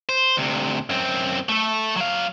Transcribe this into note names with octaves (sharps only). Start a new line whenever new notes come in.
C5
D2 C3
F#2 C4
A3 A4
F#3 F5